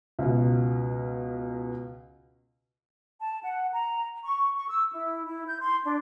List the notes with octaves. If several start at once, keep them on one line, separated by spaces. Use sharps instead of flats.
C#2 B2
A5
F#5
A#5
C#6
C#6
E6
E4
E4
G6
C6
D4